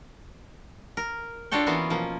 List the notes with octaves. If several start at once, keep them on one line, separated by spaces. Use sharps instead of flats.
A#4
D4 F4 F#4 A4 C#5 G5
E3 A#3 B3 C#4 F4 F#4
B2 F3 A#3